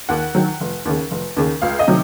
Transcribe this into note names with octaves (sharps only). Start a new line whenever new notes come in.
D#2 F#5
D#3 F#3
F1
D#2 C#3
F1
D#2 C#3
C#2 F5
D#5
C3 D#3 F#3